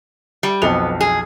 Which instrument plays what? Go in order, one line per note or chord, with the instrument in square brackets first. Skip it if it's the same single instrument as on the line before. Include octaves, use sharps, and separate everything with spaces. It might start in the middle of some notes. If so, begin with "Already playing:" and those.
[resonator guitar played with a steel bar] G3
[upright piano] B1 F2 F7 [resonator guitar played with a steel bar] B3
[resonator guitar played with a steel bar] G#4